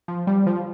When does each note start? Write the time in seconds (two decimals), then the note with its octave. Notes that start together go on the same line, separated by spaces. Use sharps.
0.08 F3
0.27 G3
0.47 F3